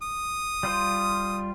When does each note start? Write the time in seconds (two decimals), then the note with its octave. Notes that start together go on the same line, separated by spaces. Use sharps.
0.02 D#6
0.63 G3 F4 C5